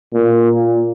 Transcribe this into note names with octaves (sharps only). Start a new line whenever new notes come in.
A#2